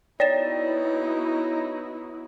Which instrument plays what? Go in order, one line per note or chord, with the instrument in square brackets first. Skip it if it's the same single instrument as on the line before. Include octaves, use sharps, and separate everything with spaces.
[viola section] B3 E4 F#4 [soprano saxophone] D#4 [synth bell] C#5 [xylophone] D5 A6 E7